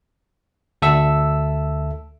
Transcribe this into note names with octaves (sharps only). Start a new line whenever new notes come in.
D2 A4 E5 E6